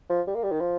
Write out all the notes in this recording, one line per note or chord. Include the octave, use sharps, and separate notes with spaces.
F3
G3
A#3
G3
D#3
F3